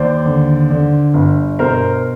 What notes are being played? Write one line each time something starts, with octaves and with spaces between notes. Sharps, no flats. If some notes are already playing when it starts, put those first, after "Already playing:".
Already playing: D#2 C5 D5
D3
D3
G1
B2 A#4 C5